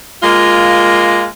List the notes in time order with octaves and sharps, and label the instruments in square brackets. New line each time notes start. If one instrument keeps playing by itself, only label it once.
[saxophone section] G#3 A#3 F4